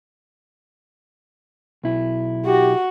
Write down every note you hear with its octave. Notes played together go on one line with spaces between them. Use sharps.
B1 E4
F#4 G4